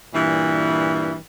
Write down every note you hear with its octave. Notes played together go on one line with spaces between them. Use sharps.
G2 A#2 E3